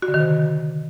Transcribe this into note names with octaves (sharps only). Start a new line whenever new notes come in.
F#4
D3
D#3
C3